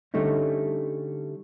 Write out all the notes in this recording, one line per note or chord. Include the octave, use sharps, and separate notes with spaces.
D3 G3 A3 C#4 D#4